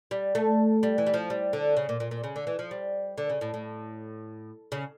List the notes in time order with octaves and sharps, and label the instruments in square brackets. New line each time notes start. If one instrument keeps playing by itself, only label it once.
[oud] G3
A3
G3
E3
G3
F3
G3
D3
C#3
A#2
A#2
A#2
C#3
D3
E3
F3
G3
D3
C#3
A2
A2
C#3